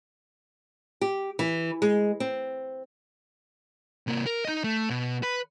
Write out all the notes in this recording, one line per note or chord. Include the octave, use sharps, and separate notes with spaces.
G4
E3
G#3
C4
C3 A#3
A#4
D#4 D#5
A3
B2
B4